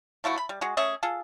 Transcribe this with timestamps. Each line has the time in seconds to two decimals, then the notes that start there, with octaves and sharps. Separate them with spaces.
0.24 F3 A3 E4 F#4
0.38 B5
0.49 G3
0.61 G#3 F#4 G#4
0.77 A3 C#4 G#4 E5
1.03 F4 G#4 A4